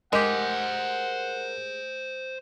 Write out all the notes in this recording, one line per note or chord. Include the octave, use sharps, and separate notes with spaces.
G#3 G4 A#4 C5 F#5 G#5